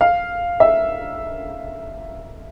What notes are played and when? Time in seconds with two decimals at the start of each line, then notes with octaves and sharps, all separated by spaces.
0.01 F5
0.60 E5